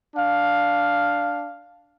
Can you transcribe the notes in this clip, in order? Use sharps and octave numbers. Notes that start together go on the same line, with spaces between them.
D4 F5